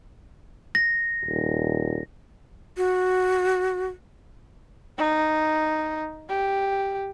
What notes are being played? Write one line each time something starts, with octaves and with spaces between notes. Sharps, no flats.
A#6
D#1
F#4
D#4
G4